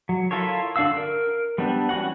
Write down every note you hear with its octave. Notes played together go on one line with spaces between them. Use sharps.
F#3
E4 F4 A4 A#4 C#5
D3 D4 F#4 F5 E6
A#4
G3 B3 C4 D4
E3 C#4 F#4 F#5